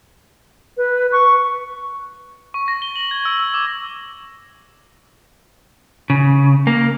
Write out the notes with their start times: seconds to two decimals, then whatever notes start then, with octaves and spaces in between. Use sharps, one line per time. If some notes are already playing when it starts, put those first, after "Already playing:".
0.77 B4
1.12 C#6
2.54 C#6
2.68 A#6
2.82 G7
2.96 F#7
3.11 G#6
3.25 E6
3.40 E6
3.54 D6
6.10 C#3
6.67 A#3